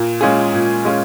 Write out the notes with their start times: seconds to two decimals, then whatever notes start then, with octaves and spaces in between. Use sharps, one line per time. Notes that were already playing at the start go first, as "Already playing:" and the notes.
Already playing: A#2
0.21 G#3 C#4 F4 G#4
0.53 A#2
0.85 G#3 C#4 F4 G#4